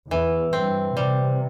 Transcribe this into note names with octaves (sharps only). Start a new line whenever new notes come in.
E2 E3
G2 C4
C3 G3